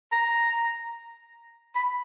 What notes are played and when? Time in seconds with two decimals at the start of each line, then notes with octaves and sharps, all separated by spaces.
0.12 A#5
1.76 B5